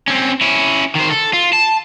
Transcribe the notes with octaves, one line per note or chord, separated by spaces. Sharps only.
C4 C#4
C#4 E4
D#3 C5
A4
F4
A5